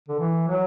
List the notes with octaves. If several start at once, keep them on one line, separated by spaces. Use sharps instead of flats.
D3
E3
F#3